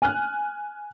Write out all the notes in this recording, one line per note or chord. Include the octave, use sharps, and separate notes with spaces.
G#5 F6 F#6